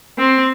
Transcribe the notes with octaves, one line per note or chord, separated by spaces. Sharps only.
C4